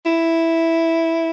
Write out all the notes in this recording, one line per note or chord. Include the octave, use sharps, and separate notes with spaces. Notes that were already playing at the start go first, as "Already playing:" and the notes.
E4